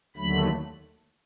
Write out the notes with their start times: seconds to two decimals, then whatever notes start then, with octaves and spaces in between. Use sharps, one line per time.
0.16 D#2 D3 F#3 A3 B5